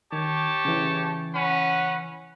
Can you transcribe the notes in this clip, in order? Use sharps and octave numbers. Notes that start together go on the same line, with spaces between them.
D#3 G4 C#5 A5
C#3 E3
C#4 B4 F#5